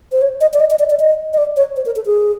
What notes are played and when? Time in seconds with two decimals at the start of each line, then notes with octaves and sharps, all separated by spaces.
0.12 C5
0.21 C#5
0.41 D#5
0.53 D5
0.60 D#5
0.70 D#5
0.79 D5
0.90 D5
0.99 D#5
1.33 D#5
1.38 D5
1.56 C#5
1.76 C5
1.86 A#4
1.96 A4
2.06 G#4